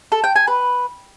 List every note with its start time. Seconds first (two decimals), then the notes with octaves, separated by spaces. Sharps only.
0.12 A4
0.24 G5
0.36 G#5
0.47 B4